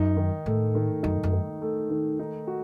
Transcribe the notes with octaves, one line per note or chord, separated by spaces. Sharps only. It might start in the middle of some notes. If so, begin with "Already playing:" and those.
Already playing: F#2 D#4
D#3
A2 A3
D#3
F#2 D#4
F#2
D#3
A3
D#3
D#4
F#4